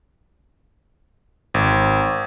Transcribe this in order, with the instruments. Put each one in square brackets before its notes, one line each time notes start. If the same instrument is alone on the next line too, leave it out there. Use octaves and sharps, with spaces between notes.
[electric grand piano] G#1